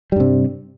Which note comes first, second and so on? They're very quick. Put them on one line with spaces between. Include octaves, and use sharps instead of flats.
G3 G2 C3